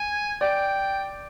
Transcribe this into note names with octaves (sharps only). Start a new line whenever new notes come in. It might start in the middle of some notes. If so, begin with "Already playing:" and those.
Already playing: G#5
D5 G5